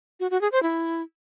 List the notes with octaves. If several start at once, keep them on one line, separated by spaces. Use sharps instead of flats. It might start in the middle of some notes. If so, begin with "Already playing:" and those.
F#4
F#4
G#4
C5
E4